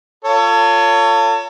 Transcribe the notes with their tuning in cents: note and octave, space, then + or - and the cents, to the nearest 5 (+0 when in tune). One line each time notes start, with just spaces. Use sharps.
F4 +0 A4 +35 C#5 +20